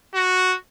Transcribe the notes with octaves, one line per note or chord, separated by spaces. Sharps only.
F#4